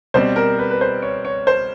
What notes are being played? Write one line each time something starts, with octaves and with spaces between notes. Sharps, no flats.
B2 G3 C4 C5
A#4
B4
B4
C5
C#5
C#5
C5